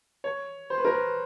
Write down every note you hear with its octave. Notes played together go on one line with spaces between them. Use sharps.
C#5
C5
B4
A#4
B4